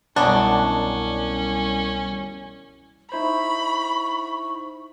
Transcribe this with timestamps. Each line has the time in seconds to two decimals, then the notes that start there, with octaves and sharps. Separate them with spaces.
0.16 C2 F#2 B2 C#4 D4
3.12 D#4 E4 C5 B5 C#6